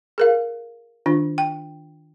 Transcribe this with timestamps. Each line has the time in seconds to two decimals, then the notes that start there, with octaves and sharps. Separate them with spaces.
0.18 G#4 A#4 F5
1.06 D#3 D4 F4
1.38 G5